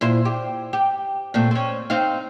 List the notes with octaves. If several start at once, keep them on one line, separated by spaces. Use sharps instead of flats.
A#2 E4 C5
G4
G4
A#2 A3 C4
C4 C#4
C4 D#4 F5